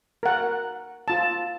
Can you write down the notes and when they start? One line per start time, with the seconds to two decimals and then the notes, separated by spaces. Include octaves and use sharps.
0.23 A#4 F#5
1.08 F4 A5